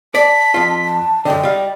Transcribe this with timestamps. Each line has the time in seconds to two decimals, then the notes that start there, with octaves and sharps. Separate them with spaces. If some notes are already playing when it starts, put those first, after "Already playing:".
0.15 D5 A5 B6
0.54 F2 F4
0.85 A5
1.25 F#2 D3 D#5 G5
1.43 G3 F5